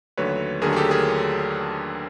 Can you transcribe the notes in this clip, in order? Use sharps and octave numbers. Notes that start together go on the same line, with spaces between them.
D#2 D3 F#3 A3 B4 C#5
D#2 D3 F#3 A3 G#4 A#4
G#4
G4 A4
G#4 A#4